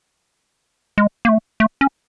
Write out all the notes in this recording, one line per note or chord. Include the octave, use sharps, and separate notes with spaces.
G#3
A#3
A3
A3
C#4